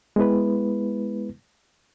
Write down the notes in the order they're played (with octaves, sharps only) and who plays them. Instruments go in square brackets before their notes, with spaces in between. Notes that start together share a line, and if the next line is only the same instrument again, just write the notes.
[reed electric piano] G#3 B3 E4 B4